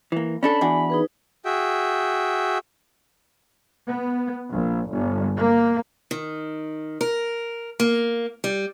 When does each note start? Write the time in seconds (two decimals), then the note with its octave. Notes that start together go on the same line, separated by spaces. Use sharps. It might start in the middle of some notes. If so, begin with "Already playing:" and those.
0.12 E3 A#3
0.43 C#4 D4 A4 B5
0.61 E2 D4 F#4 G#5
0.90 D#4 G#4 B4
1.45 F#4 G#4 E5 G5
3.88 B3
4.50 A#1
4.88 G1
5.36 A#3
6.11 D#3
7.01 A#4
7.80 A#3
8.44 G3